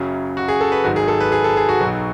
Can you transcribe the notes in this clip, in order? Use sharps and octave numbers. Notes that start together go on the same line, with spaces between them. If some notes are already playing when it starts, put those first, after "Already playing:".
Already playing: F#1 F#2 C#3 F#3
F#4
G#4
A4
B4
G#1 G#2 F#3 F#4
G#4
A4
B4
G#4
A4
G#4
F#4
B1 B2 F#3